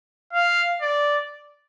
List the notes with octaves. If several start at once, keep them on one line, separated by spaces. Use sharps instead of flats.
F5
D5